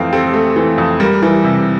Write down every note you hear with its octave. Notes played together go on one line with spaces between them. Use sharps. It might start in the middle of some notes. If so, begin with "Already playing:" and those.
Already playing: F2 E3 A3 C4 F5 G5
C4 A4
A3
E3
F2
G3 A#4
E3
C3